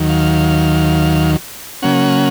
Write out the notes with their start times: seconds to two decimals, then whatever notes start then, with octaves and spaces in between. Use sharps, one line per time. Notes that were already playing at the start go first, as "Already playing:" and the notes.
Already playing: D#2 D#3 F#3
0.09 F5
1.82 C#3 F#3 A#3 C#4 F#5